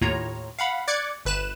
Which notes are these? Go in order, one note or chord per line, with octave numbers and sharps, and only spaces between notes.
D#2 A2 F4 C#5 A#5
F5 F#5 B5
D5 D6 F#6 G#6 C#7
G1 B4 F#6 E7